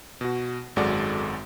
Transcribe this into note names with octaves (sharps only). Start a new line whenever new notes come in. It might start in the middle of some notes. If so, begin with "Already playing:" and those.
B2 F#4
G#1 F#2 G#3 F#4 A4 D5